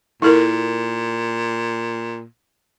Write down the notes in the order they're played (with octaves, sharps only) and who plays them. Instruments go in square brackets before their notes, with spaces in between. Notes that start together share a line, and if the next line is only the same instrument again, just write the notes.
[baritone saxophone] A#2 [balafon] E4 A4 A#4